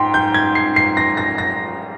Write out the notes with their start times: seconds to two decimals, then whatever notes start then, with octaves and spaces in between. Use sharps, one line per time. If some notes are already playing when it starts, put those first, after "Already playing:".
Already playing: G#2 G5 C6
0.14 G6
0.34 G#6
0.55 C7
0.76 C7
0.97 A#6
1.17 A#6
1.38 A#6